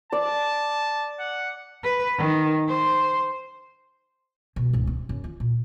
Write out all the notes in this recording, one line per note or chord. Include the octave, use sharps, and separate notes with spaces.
D5 A5
F#5
B4
D#3
C5
B2
C#2 G#2
C4
F#2
F4
A#2